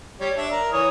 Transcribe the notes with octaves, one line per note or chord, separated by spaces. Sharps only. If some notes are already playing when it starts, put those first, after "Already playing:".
G3 C#5
D4 E5
A#4
E3 C#5 D#6